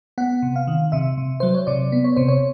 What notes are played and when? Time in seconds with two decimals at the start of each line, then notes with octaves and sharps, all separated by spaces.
0.18 B3 F#5
0.42 C3
0.56 F5
0.67 D#3
0.92 C3 E5
1.18 C3
1.40 F#3 C5
1.54 C#5
1.67 C3 D5
1.92 B3
2.04 C#5
2.16 C3 C5
2.28 C#5